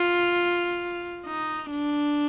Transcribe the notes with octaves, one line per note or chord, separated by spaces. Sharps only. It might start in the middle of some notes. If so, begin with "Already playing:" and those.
Already playing: F4
D#4
D4